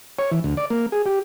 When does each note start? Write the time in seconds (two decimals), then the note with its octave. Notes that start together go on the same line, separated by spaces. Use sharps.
0.19 C#5
0.31 E3
0.44 D2
0.57 D5
0.70 A#3
0.92 G#4
1.06 G4